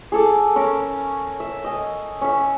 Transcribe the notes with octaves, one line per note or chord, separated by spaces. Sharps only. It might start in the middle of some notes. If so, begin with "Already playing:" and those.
G#4 A4 D6
C#4 A#4 A5
E5
D#5 G#5
C#4 E5